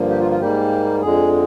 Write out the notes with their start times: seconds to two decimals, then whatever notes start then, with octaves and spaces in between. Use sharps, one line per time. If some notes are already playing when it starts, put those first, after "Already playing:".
Already playing: G2 D3 F3 A#3
0.10 G4
0.20 F4
0.30 F4
0.40 G#2 G3 A#3 G4
1.01 F2 D3 G#3 G#4